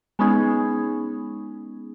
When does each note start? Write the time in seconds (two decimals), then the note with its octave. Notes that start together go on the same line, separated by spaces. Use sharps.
0.19 G#3 B3 C#4 D#4 G#4